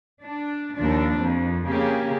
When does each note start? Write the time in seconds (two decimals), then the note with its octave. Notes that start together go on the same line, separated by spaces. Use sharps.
0.23 D4
0.77 D#2 F3 D4
1.20 F2
1.67 C#3 A#3 G4 G#4